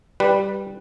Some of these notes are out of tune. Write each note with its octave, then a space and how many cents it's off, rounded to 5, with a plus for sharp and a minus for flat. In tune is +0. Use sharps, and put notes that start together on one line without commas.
G3 +0 B4 +0